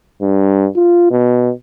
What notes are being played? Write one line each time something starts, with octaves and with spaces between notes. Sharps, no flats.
G2
F4
B2